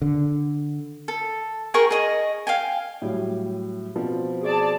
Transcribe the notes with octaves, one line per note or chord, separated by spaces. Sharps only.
D3
A4
G#4 A#4 G5 C#6
G#4 D#5
F5 G5 G#5
A2 F#3 G3
B2 F3 C4
G#4 D5 A5